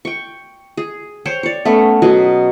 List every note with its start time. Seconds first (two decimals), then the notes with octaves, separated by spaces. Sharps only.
0.05 G5 C#6
0.77 G#4
1.25 C5 C#5 G5
1.43 C#5 D5
1.65 A3 B3 C#4
2.02 B2 F#3 G#4